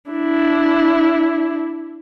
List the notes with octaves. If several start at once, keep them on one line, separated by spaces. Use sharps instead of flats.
D4 E4